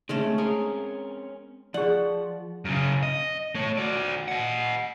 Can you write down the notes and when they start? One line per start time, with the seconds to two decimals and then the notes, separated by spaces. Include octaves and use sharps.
0.09 G#3 A3 C4 C#4
0.38 C4 C#4 G#4 A#4
1.74 F3 G#4 D5 F#5
2.65 F#2 C#3
3.03 D#5
3.55 A3 C#5
3.77 F#4 D5
4.28 D#5 F#5